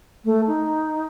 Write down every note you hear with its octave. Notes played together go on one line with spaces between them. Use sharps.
A3
D#4